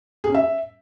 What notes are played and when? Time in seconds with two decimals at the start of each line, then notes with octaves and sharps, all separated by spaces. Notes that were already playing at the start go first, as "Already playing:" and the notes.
0.24 G#4
0.29 C#4
0.34 E5